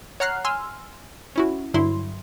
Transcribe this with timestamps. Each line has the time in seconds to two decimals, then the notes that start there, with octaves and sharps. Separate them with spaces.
0.20 C#5 F#5 A#5 F6 F#6 C7
0.45 G#5 C6 E6 F6
1.36 C#4 E4 F#4
1.74 G2 D3 F#3 E4 C6